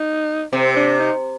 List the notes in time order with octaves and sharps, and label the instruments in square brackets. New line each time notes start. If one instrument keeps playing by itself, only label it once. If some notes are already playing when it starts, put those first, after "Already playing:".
Already playing: [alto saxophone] D#4
[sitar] C3 [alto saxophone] C4
[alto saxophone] D4
D#4